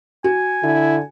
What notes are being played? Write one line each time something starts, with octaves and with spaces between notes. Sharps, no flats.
F#4 G#5
D3 E4